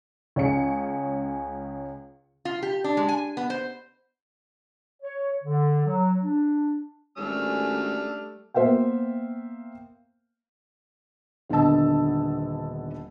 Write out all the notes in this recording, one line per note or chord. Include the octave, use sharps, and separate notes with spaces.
C#2 C#4 G#4 C#7
F4
G4
D4
G#3
G#5
B3
C5
C#5
D3
F#3
D4
G#1 G3 A3 C#4 D4 E6 F6
A#3 B3 C5 E5 F5 G5
D#1 D3 B3 D#5 A5 E6